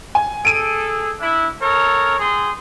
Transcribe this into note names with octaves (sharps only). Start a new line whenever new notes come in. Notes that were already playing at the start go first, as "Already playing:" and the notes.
G#5
G#4 A4 D7 D#7
D4 E4
A4 A#4 C#5
C4 G#4 C6